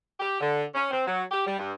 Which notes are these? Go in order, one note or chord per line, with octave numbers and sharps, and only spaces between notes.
G4
D3
C#4
C4
F#3
G4
G3
G2